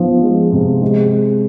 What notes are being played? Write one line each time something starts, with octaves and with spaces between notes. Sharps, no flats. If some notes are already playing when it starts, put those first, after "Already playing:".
Already playing: F3 B3
G#3
C3
G#3